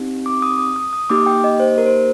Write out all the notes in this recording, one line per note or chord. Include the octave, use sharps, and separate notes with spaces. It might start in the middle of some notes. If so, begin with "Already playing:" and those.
Already playing: C4 D#4 G4
D6
D#6
D#6
D#6
D#6
A#3 D#4 G4 D6
G5
D#5
C5
A#4
C5